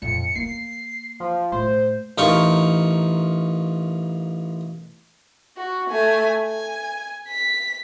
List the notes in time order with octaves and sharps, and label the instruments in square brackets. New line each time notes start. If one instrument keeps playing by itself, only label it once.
[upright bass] F2 A#2 [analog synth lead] C#7
[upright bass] A#3 [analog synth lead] C7
[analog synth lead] F3
[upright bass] A2 A3 [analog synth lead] C5
[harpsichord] A1 D#4 F4 A#4 C#6
[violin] F#4
A3 G#5
G#5
B6